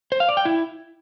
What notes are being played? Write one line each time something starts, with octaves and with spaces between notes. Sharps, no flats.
C5
F5
D5
G5
E4